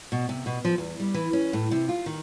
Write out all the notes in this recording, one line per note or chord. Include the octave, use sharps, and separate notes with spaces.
B2
C3
B2
F3
E2
G3
E3
C#4
A2
C3
F4
D#3